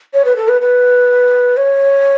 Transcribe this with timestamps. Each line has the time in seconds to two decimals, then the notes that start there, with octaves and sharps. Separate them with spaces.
0.14 C#5
0.25 B4
0.36 A4
0.49 B4
0.61 B4
1.57 C#5